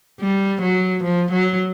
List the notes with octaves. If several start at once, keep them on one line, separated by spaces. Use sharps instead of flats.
G3
F#3
F3
F#3